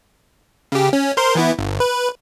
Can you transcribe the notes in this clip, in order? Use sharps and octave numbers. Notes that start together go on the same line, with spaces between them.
C#3 G4
C#4
A#4 C5 C6
E3 B3 E4
G1
B4